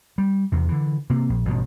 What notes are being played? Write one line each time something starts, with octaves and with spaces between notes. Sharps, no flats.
G3
E2 C3
D3 E3
C3 A#3
A#1
A1 G2 B2